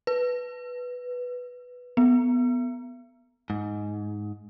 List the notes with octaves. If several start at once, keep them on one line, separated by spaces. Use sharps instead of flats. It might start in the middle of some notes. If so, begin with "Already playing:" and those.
B4
B3
G#2